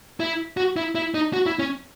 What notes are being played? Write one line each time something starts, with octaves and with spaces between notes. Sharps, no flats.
E4
F#4
E4
E4
D#4
F#4
E4
C#4